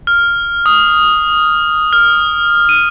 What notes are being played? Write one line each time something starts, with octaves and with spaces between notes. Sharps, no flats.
F6
D#6
F6
D#7